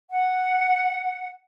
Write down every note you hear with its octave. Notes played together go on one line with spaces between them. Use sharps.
F#5